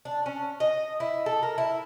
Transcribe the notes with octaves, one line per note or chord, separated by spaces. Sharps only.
D4
C#4
D#5
E4
A4
A#4
E4